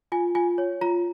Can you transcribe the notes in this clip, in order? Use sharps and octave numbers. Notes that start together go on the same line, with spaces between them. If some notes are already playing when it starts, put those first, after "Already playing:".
F4 G#5
F4 G#5
C#5
F4 A#5